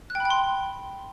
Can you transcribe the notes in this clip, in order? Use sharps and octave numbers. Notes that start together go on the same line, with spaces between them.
F#6
G5
B5
G5
C6